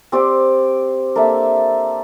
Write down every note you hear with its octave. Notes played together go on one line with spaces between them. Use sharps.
C4 G4 D5
A#3 D4 A4 E5